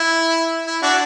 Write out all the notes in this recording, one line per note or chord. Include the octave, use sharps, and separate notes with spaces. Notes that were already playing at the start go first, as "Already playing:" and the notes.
Already playing: E4
E4
D4 F#4